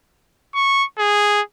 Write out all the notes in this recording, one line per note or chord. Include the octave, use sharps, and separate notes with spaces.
C#6
G#4